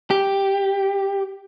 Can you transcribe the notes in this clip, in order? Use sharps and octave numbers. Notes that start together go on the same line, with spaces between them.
G4